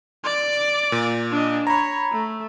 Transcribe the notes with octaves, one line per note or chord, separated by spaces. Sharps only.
D5 D6
A#2
D4 D#5
C#5 A#5 B5
A3